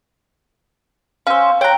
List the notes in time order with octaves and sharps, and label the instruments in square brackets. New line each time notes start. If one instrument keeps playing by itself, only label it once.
[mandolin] C#4 C5 [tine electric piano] F5 E6
[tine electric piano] C#5 F#6 [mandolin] G5 A#5